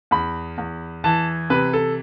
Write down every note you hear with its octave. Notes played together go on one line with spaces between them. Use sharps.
E2 B5
E2
E3 A5
C3 B4
A4